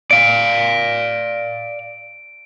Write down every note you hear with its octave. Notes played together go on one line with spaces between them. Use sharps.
D5 F5 D7